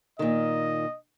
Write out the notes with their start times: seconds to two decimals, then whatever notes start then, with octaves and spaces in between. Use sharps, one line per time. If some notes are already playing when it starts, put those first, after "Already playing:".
0.19 A#2 D#3 D#5